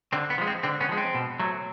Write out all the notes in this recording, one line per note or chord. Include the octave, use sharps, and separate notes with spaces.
D3 C4
B3
F3 G#3
C4
D3 C4
B3 C#4
F3 G#3
C4
B2
F#3 A3